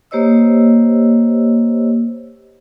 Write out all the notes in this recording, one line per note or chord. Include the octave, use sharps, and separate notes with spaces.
A#3 G4 C5 C#5 D#5 E6